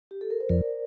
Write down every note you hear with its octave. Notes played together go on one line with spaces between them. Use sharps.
G4
A4
A#4
C5
F2 A#4 D5